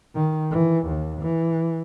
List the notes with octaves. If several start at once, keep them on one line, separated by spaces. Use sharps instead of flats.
D#3
E3
D#2
E3